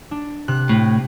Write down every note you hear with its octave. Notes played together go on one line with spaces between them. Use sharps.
D4
C3 F#6
A2